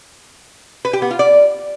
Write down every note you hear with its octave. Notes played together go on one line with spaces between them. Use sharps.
B4
G4
B3
F4
D5